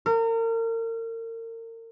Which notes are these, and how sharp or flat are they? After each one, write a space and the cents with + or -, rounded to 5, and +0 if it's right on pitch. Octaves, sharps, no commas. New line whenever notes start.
A#4 -35